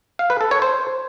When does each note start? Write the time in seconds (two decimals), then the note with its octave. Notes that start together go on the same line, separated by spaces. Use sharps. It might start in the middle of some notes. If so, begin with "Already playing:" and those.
0.19 F5
0.30 B4
0.41 A4
0.51 C#5
0.62 C5